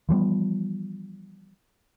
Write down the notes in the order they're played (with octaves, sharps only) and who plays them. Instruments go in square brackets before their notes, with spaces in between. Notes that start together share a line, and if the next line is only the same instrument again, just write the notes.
[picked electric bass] E3 F3 G3 B3